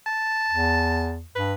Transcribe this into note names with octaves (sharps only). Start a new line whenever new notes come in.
A5
E2
G2 B4